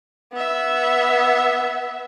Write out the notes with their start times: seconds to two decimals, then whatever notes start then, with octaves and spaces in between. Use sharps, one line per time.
0.33 B3 E5